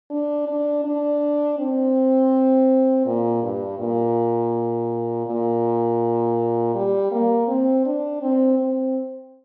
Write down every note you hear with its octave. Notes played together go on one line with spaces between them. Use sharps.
D4
D4
D4
C4
A#2
G2
A#2
A#2
G3
A#3
C4
D4
C4
C4